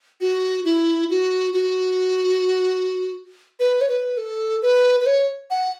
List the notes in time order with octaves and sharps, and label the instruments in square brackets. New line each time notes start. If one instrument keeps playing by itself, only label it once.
[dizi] F#4
E4
F#4
F#4
B4
C#5
B4
A4
B4
B4
C#5
F#5